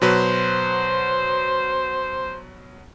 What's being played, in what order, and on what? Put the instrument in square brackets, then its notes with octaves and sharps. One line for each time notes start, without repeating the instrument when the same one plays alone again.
[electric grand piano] B2 F#3 B4 [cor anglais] C5